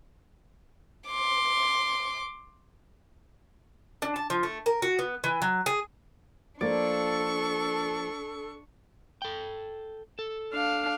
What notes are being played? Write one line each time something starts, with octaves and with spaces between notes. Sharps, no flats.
C6 D6
D4
A5
F3
A3
A#4
F#4
B3
E3
F#3
G#4
F3 A#3 D4 A4 D5 C#6
A4 G5
A4
D4 F5